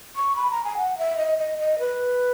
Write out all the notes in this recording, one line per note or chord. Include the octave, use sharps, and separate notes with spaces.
C#6
B5
A#5
G#5
F#5
E5
D#5
D#5
D#5
B4